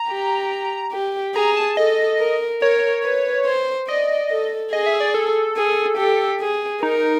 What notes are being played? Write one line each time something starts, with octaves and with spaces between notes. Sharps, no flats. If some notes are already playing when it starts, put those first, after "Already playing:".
Already playing: A#5
G4
G4
G#4 A#5
A5
A4 D#5
A#4
A#4 C#5
B4
C5
D5 D#5
A4
G#4 D#5
E5
D5
A4
G#4
G4
G#4
D#4 A#4